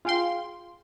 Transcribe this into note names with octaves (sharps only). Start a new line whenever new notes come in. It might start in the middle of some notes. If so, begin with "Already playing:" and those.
F4 G#4 F5 G5 C6